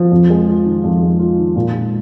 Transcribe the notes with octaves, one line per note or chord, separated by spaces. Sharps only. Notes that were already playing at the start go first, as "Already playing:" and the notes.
Already playing: F3
F2
G#3
F4
D#3
F2
G#3
F4
D#3
A#2
G#3